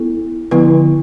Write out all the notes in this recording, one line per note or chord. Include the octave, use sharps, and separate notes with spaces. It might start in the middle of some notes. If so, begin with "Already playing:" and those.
Already playing: B3 E4 A4
D3 F3 B3 E4 B4